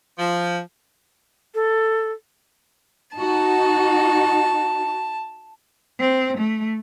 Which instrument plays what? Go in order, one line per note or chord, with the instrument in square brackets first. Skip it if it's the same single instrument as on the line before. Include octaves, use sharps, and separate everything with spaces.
[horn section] F3
[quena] A4
[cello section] D#4 F#4 [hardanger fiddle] A5
[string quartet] C4
A3